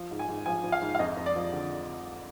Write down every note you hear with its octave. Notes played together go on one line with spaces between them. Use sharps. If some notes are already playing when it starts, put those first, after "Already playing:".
Already playing: F3
G#2
G#5
G#2
F3 G#5
F3
F5
G#2
F5
F2 D#5
F2
D5
F3
D3